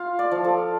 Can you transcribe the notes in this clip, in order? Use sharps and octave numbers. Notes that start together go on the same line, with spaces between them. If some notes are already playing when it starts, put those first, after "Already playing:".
Already playing: F4 F5
D5
F3
A4